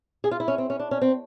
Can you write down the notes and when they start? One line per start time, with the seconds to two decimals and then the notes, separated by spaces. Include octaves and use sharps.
0.24 G#4
0.31 F4
0.40 E4
0.48 C#4
0.58 C4
0.70 C#4
0.79 D4
0.91 C#4
1.01 C4